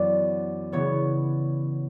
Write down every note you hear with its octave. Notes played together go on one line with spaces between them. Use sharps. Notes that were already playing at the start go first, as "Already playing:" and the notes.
Already playing: F#2 E3 B3 D5
C#3 E3 B3 C#5